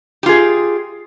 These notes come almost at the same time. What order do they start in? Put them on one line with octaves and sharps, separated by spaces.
G4 F4 G#4 D#5